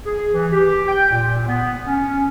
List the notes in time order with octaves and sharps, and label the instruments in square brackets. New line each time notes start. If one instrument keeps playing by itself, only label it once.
[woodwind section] G#4
E3
G4
G5
A#2
B3
C#4